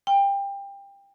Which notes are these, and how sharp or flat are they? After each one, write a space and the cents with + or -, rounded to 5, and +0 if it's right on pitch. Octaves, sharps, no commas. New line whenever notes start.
G5 +25